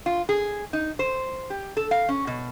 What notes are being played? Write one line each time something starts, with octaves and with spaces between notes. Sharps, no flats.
F4
G#4
D#4
C5
G4
A4
F5
C#4
B2